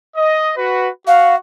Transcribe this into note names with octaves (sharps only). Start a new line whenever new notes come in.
D#5
F#4 B4
F#4 F5